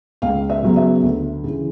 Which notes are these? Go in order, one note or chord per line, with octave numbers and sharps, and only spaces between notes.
C#2 F5
E5
C#3 F#3 B3
E5
D2
C#3 E3